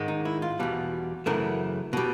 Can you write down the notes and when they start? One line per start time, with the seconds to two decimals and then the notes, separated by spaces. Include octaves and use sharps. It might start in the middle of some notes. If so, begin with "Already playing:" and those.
Already playing: G#2 D#3 G#3
0.08 D#4
0.25 E4
0.42 F4
0.59 E2 B2 G3
1.26 F#2 C#3 E3 A3 A#4
1.93 B2 G3